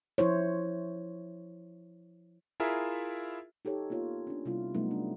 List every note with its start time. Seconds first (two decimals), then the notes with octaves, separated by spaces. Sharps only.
0.18 F3 E4 C5 C#5
2.60 E4 F4 G#4 A#4 E5
3.65 D#4 G4 A4 C#5
3.90 A#3 B3 F4 C#5
4.27 C#4 D4
4.45 C3 G3 B3 E4 F4
4.74 C3 F#3 G3 A3 B3 D#4
4.91 D4